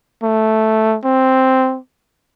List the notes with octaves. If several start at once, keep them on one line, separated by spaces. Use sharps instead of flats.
A3
C4